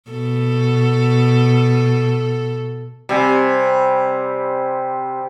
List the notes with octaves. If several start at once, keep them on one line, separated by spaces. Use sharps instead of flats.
B2 A4
C3 G3 C4 G#5